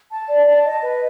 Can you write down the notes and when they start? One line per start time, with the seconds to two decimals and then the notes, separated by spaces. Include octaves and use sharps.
0.09 A5
0.27 D5
0.45 A5
0.64 D#5
0.82 B4